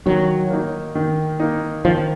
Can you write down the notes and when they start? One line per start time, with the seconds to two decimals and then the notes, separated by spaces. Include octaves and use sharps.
0.06 D#3 F#3
0.50 A#3 D#4
0.95 D#3
1.40 A#3 D#4
1.85 D#3 F3